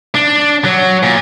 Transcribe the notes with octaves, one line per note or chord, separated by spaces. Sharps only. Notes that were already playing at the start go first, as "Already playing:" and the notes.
D4
F#3
A#2